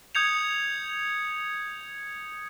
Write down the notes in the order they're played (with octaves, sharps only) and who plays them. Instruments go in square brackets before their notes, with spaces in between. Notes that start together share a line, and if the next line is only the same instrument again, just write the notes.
[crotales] D#6 G6 G#6 C#7 F7